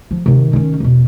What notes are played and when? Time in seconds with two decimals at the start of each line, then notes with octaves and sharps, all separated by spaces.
0.11 F3
0.26 C3 D#3
0.53 D#3 C#4
0.80 E2 B2